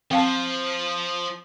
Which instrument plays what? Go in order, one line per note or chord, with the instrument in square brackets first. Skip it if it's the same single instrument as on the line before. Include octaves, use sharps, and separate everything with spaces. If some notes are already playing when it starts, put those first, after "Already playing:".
[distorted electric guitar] F3 [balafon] C4 F5 A5